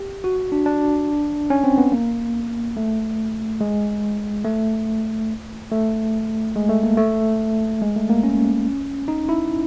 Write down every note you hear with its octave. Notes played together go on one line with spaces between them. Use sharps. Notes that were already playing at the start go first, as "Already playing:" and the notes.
Already playing: G4
F#4
D4
D4
C#4
C4
B3
A#3
A3
G#3
A3
A3
G#3
A3
A#3
A3
G#3
A3
A#3
C#4
D#4
E4